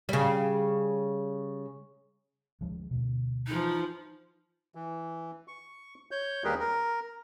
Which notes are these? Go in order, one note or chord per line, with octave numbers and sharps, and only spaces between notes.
C#3 G3
D2 F3 G#3
D2 B2
E3 F3 D#4
E3
C#6
C#5 G6
D#2 G3 G4 G#4 A#4 B4
A#4